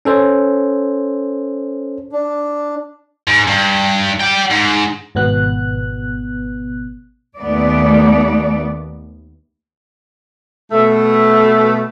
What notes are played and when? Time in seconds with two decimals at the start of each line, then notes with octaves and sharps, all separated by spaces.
0.05 C#4 A4 C5 C#5
2.12 D4
3.27 G#2
3.47 G2
4.21 D5 G5
4.51 G#2
5.15 G#1 B2 B3 F#6
7.37 D#2 A3 B3 D5
10.72 B2 A3